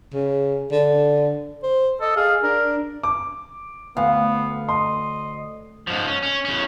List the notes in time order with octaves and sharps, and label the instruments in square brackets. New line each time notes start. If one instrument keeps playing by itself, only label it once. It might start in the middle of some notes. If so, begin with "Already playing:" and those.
[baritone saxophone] C#3
D3
[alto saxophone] C5
[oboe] A4 [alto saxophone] D#5
[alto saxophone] G#4 [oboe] F5
[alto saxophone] D4 [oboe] A#4
[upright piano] D6
[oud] D2 [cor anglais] B3 [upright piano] F5
[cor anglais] D#5 [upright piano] C6
[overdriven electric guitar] G#2 F3
C#4
C#4
E2 C#4